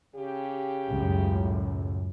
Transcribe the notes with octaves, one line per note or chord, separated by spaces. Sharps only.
C#3 G4
C#2 F#2 A2